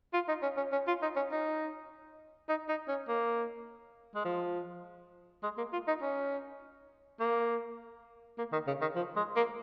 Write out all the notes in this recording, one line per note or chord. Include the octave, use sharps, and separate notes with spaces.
F4
D#4
C#4
C#4
C#4
F4
D#4
C#4
D#4
D#4
D#4
C#4
A#3
G#3
F3
G#3
A#3
F4
D#4
C#4
A#3
A#3
D#3
C#3
D#3
F3
G#3
A#3